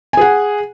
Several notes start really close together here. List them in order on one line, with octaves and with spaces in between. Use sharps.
G#5 G#4 F#5